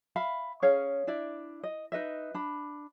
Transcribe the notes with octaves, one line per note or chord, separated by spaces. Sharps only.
E5 F5 B5
C#4 G#4 C#5 F5
D4 E4 D5 E5
D#5
D#4 B4 D#5 E5
D4 B5